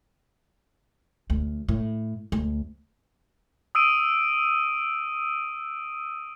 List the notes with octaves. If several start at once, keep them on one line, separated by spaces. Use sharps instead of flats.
D2
A2
D2
D#6 E6 D7 D#7